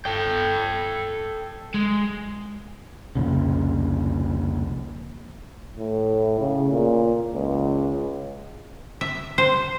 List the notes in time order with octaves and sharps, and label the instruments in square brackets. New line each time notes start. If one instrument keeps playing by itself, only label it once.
[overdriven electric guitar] A4 G5
G#3
[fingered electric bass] C2 F2 A#2 C#3
[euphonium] A2
C#3
A#2
C#2
[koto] E5
C5